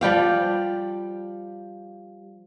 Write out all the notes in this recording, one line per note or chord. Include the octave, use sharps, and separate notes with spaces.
F3 G3 G4 F5